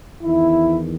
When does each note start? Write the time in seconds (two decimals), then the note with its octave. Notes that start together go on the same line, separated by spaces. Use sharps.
0.23 E2 D#3 E4